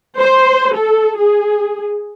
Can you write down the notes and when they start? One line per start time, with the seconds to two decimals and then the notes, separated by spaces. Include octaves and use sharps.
0.19 C5
0.76 A4
1.19 G#4